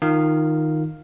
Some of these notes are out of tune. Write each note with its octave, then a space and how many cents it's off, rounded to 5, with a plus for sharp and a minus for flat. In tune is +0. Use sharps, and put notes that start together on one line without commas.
D#3 +0 F4 +0 F5 +0